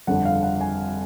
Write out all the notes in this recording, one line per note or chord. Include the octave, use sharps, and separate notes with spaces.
G1 F2 D3 F#5
F5
F#5
G#5